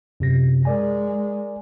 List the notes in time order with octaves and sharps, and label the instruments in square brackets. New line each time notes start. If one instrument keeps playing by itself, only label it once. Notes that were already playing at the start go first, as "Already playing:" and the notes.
[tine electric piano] F#2 C3 A#6
[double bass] G#3 [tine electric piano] A#4 D5 G#5